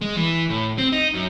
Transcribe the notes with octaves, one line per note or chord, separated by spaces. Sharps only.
G#3
E3
A2
C4
D#4
F#2